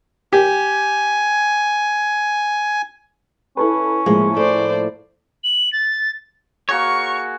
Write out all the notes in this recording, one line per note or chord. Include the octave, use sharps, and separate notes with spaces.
G4 G#5
C#4 E4 A4 B4
A2 F3 G#3 A#3
A4 C5 D5
F#7
A6
A#3 F#4 G#4 C#5 C#6